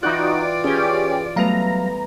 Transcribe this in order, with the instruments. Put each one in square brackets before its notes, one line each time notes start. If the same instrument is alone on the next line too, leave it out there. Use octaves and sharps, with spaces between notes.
[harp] E3 G5 F#6 [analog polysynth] D#4 F#4 [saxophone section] F4 D5
[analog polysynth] C#4 G4 [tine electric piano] G#4 B4
[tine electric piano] F#3 F5 [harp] G3 A3 B3 [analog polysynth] A#5